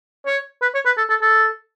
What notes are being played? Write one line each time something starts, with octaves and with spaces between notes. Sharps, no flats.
C#5
B4
C#5
B4
A4
A4
A4